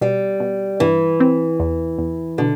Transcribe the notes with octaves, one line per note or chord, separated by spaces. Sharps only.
B2 G3
B2
G2 E3
C4
E2
E2
B2 D3